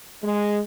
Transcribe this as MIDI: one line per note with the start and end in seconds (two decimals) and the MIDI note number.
0.23 0.59 56